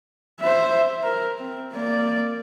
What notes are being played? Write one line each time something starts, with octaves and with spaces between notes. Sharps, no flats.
C5 E5
A#4
C4
A#3 D5